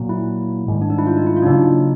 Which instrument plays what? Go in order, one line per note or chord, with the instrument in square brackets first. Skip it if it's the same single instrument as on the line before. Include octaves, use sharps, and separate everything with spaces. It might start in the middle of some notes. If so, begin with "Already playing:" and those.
Already playing: [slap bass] A#2 F#3 A#3
[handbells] E4
[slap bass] G#2 D#3 G3
[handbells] D4
D#4
E4
F4
D#4
E4
F4
D4
[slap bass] C#3 F#3 A#3 [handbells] D#4